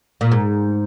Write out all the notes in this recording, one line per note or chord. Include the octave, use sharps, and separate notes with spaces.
A#2
G#2